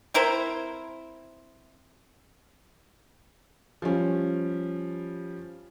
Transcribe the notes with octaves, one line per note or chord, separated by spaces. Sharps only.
C4 E4 A#4 C5
F3 G3 C#4